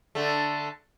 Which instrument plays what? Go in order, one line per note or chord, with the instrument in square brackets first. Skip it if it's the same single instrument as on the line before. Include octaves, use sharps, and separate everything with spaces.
[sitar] D3 A3